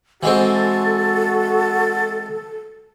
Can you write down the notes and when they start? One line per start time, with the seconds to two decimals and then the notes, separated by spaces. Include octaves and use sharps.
0.23 E3 G#3 C4 F#4 A4